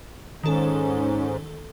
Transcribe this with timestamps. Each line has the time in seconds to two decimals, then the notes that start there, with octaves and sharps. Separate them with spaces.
0.43 G#2 D#3 C#4 A4